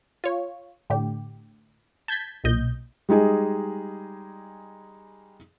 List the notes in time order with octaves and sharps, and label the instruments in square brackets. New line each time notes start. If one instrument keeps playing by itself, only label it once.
[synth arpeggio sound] F4 C#5
A2 D3 G4
A5 G6 G#6 B6
B1 A#2 D#5 G6
[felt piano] G3 G#3 D#4 G#4